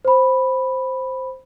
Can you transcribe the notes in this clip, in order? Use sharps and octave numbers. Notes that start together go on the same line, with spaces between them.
C5 B5